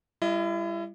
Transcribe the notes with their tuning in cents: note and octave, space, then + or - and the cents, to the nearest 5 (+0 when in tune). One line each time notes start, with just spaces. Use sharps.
G3 +20 E4 +35 D#5 +0